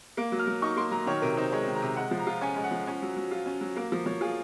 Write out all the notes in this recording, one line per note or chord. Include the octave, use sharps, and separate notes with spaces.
A#3
F#3
F6
F#3
D#4 C#6
A#3 C6
F#3 A#5
D#3 C#5
C3 A#4
D#4 C5
G#3 C#5
D#3
A#5
C3
G#3 F#5
F3
A#5
F4
C#4 G#5
G#3
F#5
F3
C#4
F#3
F#3
F4
C#4
F#3
A#3 F5
F3
F3 C#5
F4 G#4